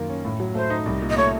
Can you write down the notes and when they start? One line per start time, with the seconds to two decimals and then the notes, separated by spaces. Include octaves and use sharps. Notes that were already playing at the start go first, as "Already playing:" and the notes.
Already playing: F#2 D#3 A#3 F4
0.09 C#4
0.25 A2
0.40 F#3
0.55 A3 C5
0.70 D#4
0.86 C2
1.01 A#2
1.09 D#5
1.17 A3 C#5